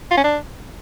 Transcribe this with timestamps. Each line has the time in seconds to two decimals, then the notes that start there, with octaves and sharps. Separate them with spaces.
0.11 F4
0.17 C#4
0.24 D4